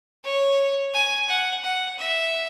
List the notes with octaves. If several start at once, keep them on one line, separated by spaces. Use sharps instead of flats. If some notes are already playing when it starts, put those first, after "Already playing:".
C#5
G#5
F#5
F#5
E5